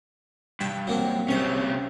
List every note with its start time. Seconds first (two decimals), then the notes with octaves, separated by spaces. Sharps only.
0.60 G2 G5 A5
0.87 F#3 A#3 C4
1.28 C2 C3 C#4 C5